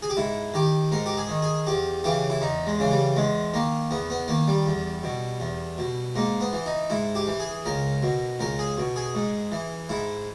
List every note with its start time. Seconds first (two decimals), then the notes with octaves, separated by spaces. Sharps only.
0.02 G#4
0.10 G4
0.17 G#2 E4
0.54 D#3 G4
0.92 G#2 A#4
1.06 G4
1.17 G#4
1.29 D#3
1.42 G#4
1.67 E2 G4
2.04 C#3 E3 G4
2.30 E4
2.41 E2 D#4
2.67 G#3
2.79 C#3 E3
2.91 G3
3.16 E2 G#3
3.54 D#3 A#3
3.91 E2 B3
4.10 B3
4.28 D#3 A#3
4.48 G3
4.66 E2
5.03 B2
5.40 E2
5.78 B2
6.15 G#2 A#3
6.41 B3
6.53 E3
6.66 D#4
6.90 G#2 E4
7.15 G4
7.27 E3
7.40 G#4
7.66 C#2 A#4
8.03 B2
8.40 C#2 A#4
8.59 G#4
8.78 B2
8.96 G#4
9.15 G#2
9.52 E3
9.89 G#2 E4